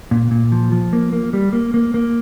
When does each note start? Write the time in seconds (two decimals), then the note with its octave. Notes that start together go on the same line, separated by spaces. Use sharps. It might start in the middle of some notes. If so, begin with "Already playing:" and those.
0.11 A#2
0.31 A#2
0.52 F3
0.72 F3
0.93 A#3
1.13 A#3
1.33 G3
1.53 A#3
1.74 A#3
1.94 A#3